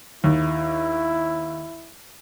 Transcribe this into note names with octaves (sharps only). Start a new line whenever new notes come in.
D#2 E4